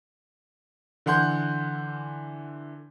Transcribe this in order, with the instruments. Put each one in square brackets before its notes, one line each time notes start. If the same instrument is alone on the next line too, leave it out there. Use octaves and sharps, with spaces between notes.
[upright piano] D3 E3 F#5 C6 G6